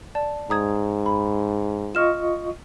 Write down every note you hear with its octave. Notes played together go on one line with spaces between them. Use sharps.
D5 A5
G#2 A#5 D#6 G#6
B5
F4 D#5 C#6 F6 E7